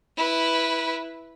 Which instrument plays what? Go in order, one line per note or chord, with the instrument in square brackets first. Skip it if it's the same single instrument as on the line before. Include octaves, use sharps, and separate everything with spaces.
[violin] E4 B4